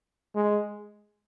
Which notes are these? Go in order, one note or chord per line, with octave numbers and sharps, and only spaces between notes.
G#3